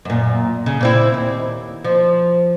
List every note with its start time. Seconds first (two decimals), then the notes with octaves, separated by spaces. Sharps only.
0.05 F#2 A#2
0.66 C#3
0.81 A#2 C4 E4
1.14 D#2
1.85 F3